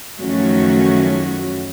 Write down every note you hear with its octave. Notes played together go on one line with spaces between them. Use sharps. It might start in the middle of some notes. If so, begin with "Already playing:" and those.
F#2 D#3 F3 A3 C#4 F#4